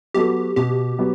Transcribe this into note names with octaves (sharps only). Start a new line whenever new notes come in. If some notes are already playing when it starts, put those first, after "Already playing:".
F#3 B3 F#4 G4 A4
B2 G4
F#3 B3